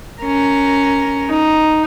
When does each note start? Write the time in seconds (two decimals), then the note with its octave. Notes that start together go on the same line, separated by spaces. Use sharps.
0.22 C#4 A#4
1.29 D#4